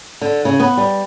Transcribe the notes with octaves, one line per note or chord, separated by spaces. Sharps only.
D3
C#3
B3
G3